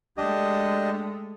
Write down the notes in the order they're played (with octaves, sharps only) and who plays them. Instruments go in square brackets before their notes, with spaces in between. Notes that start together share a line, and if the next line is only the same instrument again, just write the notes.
[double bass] G#3 A3 [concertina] D4 G4 D#5